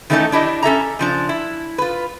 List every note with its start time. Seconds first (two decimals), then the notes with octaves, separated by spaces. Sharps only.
0.10 D#3 E3 A3 C#4 D#4 A4
0.32 D4 E4 G4 D#5
0.63 C#4 A4 E5 A#5
0.99 C#3 F3 D4
1.29 E4
1.78 F4 B4